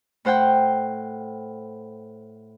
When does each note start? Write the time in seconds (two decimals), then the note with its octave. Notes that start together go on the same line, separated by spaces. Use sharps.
0.25 A2 C5 F#5 G5 G6